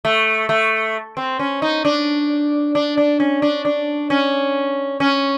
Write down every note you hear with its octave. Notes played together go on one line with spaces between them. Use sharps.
A3
A3
C4
C#4
D#4
D4
D4
D4
C#4
D4
D4
C#4
C#4